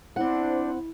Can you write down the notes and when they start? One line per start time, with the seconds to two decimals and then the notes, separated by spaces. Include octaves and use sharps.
0.16 C4 D4 E4 C5 F#5